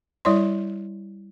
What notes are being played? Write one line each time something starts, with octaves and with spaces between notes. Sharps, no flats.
G3 E4 C#5 D5 C6